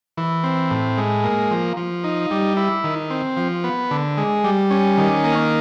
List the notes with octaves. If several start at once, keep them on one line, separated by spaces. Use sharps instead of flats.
E3
C4
A2
G#3
A#3
F3
F3
D#4
G3
E4
D#3
C4
F3
B3
D3
G#3
G3
C#4
D#3
A#3